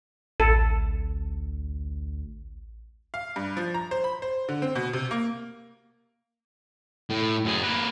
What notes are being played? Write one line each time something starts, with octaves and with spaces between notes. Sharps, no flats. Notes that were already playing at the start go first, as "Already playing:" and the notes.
A1 D2 A4
F5
G2
F3
A#5
C5
B5
C5
D3
C4
B2
C3
A#3
A2
F#2 G#4
A#3 B4